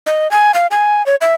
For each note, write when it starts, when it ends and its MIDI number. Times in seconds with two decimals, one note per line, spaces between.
0.06 0.30 75
0.31 0.54 80
0.54 0.67 77
0.71 1.05 80
1.06 1.16 73
1.21 1.35 76